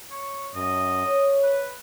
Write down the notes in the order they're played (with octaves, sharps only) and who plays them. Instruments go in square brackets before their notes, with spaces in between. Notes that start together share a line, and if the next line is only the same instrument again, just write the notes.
[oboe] C#5
[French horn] F#2 [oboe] D#5
[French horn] C#5
[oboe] B4